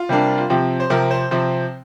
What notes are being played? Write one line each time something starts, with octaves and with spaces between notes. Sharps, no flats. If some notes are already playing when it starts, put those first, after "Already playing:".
Already playing: F4
C3 G3 A#3 D4
F4
C3 F3 C4 G4
C5
C3 F3 C4 A#4
C5
C3 F3 C4 C5